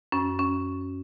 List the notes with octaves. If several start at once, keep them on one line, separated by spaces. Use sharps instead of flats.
F#2 C#4
C#4